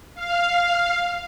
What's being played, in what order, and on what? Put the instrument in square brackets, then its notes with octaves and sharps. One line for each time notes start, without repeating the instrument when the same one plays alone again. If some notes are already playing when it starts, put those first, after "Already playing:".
[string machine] F5